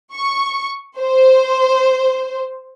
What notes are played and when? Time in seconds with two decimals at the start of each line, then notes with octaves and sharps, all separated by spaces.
0.14 C#6
0.98 C5